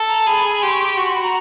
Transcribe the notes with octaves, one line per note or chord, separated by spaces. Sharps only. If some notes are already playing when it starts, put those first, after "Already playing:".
Already playing: A4
A#5
G#4 B5
B5
G4 C6
C#6
C6
F#4 C#6
C6
B5
A#5